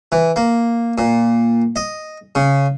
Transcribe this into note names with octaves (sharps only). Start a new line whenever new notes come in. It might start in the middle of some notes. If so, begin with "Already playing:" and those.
E3
A#3
A#2
D#5
C#3